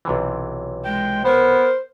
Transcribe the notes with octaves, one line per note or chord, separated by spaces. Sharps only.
B1 C3 E3
G#3 G5
B3 A#4 C5